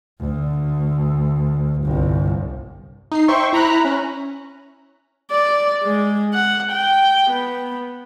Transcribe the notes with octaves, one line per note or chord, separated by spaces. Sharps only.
D2
G1 C2
D#4 C7
C5 E5 G5 C6 C#6
E4 A#5 B5 F#6
C#4
D5
G#3
F#5
G5
B3